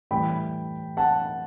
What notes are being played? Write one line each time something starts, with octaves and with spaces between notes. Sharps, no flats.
A2 E3 G3 G5 B5
F#5 A5